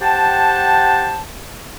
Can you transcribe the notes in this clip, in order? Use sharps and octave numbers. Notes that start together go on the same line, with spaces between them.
G4 C5 F#5 G5 A5